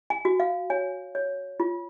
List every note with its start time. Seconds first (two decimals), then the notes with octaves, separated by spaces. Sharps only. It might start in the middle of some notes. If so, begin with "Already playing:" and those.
0.10 G#5
0.25 F#4
0.40 F5
0.70 C#5 G#5
1.15 C#5
1.60 F4